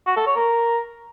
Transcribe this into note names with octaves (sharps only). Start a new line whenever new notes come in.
F#4
A4
C#5
A#4